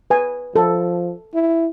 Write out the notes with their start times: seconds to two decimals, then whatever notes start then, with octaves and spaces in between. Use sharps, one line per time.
0.10 B4 G#5
0.56 F3 A4
1.34 E4